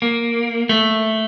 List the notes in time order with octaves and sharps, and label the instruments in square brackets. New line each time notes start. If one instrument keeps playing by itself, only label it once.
[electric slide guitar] A#3
A3